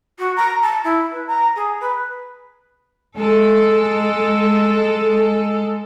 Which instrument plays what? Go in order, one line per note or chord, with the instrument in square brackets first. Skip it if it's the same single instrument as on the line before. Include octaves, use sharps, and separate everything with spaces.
[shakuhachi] F#4
A#5
A5
E4
B4
A#5
G#4
B4
[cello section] G#3 A4